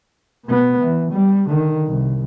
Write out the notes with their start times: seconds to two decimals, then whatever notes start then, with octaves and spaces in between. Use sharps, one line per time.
0.45 B2 B3
0.82 E3
1.11 G3
1.49 D3 D#3
1.87 C2